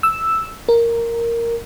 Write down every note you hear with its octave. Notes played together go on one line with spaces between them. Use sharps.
E6
A#4